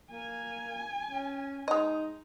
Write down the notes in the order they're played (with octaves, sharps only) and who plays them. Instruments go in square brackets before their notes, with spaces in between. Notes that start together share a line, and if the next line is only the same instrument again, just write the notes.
[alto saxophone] A#3 [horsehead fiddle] G#5
[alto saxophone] C#4
[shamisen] G#3 D#5 [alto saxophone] D#4